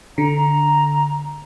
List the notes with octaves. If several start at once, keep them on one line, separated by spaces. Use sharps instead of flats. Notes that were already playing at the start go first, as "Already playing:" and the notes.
D3 A#5